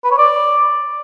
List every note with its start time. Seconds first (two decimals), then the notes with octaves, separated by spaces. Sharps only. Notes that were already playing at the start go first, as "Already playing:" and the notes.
0.04 B4
0.11 C#5
0.18 D5